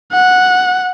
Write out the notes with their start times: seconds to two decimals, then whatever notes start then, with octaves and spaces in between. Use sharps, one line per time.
0.12 F#5